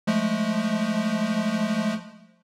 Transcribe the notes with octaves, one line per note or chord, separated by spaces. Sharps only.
F3 G#3 A3